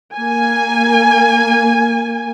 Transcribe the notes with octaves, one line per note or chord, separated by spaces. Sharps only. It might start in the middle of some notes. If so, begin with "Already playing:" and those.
A#3 G#5